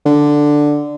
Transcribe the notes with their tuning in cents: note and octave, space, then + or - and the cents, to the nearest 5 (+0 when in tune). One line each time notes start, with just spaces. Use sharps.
D3 +5